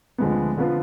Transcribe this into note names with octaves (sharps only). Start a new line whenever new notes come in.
D2 D3 F3 G#3 B3
D3 F3 B3 F4 B4